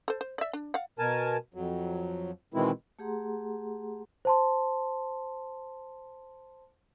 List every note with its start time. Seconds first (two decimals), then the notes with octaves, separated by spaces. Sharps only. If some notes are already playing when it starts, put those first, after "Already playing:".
0.08 A4 C5
0.21 C5
0.38 D5 E5
0.53 D4
0.74 F5 F#5
0.99 B2 A#4 G#5 A5
1.54 F2 F#3
2.54 B2 D#3 E3 G#3 C4 E4
2.99 A3 G4 G#4 F#5 A#5 C6
4.25 C5 A5 C6